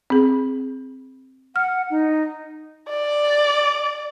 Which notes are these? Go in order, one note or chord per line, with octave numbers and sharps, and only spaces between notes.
C4 G#4
F#5 F6
D#4
D5